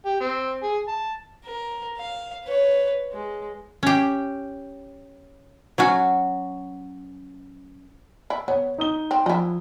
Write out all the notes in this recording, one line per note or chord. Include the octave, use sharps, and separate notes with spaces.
G4
C4
G#4
A5
A#4
F5
B4 C#5
G#3
C#4 G4
F#3 C#4 F#4
E4
B3 C#5
D#4 D#6 G7
C4
F3 D#4 E4